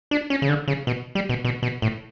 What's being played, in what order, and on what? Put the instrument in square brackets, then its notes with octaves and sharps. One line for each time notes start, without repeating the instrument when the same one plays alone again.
[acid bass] D4
C#4
C#3
D3
C#3
B2
G3
B2
B2
B2
A2